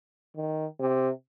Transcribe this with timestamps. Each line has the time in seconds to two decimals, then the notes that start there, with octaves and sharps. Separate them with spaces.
0.36 D#3
0.80 C3